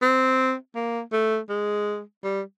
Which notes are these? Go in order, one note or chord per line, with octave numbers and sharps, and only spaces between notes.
C4
A#3
A3
G#3
G3